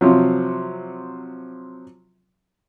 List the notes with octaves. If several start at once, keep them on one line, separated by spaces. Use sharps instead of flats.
C3 F3 F#3